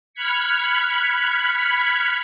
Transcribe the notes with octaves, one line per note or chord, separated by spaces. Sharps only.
B5 F6 F#6 G#6 B6 C#7